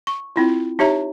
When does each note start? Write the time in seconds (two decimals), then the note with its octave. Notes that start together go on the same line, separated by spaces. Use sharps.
0.07 C#6
0.36 C4 E4 F4
0.79 D#4 G4 C#5 E5 A#5